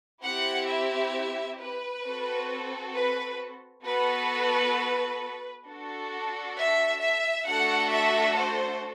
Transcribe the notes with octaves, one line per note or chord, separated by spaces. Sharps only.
C4 E4 G4 F#5
E5
B4
C4 F#4 A4
B4
B3 F#4 A4 B4
D4 F#4 A4
E5
E5
A3 D4 F#4 A4 F#5
E5
C5